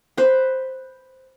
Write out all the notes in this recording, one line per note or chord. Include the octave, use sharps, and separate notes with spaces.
B4 C5